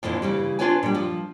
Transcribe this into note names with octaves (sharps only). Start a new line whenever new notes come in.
F2 A#2 D3 E3
C#3 E3 G3
D4 F4 B4 C#5 G#5
A#2 G3
F3